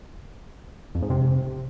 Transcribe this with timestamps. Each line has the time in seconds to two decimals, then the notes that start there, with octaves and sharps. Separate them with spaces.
0.95 F2
1.02 G#2
1.10 C3